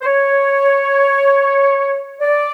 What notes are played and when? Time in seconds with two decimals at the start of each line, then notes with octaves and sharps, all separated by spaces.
0.02 C5
0.06 C#5
2.21 D5